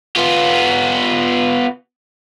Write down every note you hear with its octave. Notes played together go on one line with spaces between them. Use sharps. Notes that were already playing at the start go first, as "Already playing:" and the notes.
B3 F4